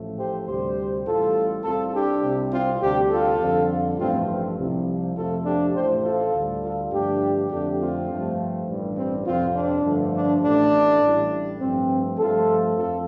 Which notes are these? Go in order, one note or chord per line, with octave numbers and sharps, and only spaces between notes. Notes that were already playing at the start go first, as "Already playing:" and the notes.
Already playing: A1 A2 F3 A3
G4 C5
D2 C3 G3 G4 C5
A1 A2 G3 F4 A4
C2 C3 G3 F4 A4
D4 G4
C2 C3 G3
C4 F4
D2 C3 G3 D4 G4
F4 A4
F2 D3 G3
A1 G2 F3 A3 C4 F4
C2 C3 F3
F2 C3 F3 A3 F4 A4
D4 G4
A1 A2 A3 G4 C5
F4 A4
D2 D3 G3
F4 A4
G2 D3 F3 A3 D4 G4
F2 D3 A3 D4 G4
C4 F4
G2 F3 A3
A1 G2 G3
C4
F2 C3 F3 C4 F4
D4
G2 D3 F3 A3
D4
A1 A2 A3 D4
A1 A2 G3
G2 F3 A3 C4
G2 F3 A3 F4 A4
F2 F4 A4